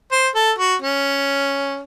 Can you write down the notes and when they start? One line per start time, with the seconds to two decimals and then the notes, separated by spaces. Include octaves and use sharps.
0.12 C5
0.35 A4
0.58 F#4
0.82 C#4